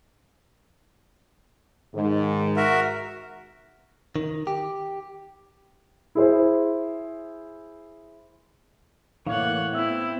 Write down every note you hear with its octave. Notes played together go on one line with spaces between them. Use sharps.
G#2 D#3
F#4 A#4 E5
D#3
G4
E4 G#4 C5
A2 E3 A#3 C#5 D5 F5 F#5
B3 C4 E4 E5 E6